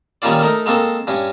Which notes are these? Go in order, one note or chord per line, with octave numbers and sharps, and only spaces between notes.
D#3 G3 A#3 C#4 F4 D5
A3 D#4 A#4
G#3 A#3 C4 A4
G2 C#4